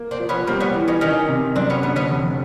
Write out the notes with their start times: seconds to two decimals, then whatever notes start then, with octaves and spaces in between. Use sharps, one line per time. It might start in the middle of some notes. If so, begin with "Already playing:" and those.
Already playing: A#3
0.11 C4 D4
0.20 F3
0.29 B3 C#4
0.47 G3 A#3 C4
0.60 B3 C#4
0.75 E3
0.88 C#4 D#4
1.01 D#3 C#4 D#4
1.29 C3
1.56 F#2 C4 D4
1.70 B3 C#4
1.83 D3 A3 B3
1.96 B3 C#4
2.10 F1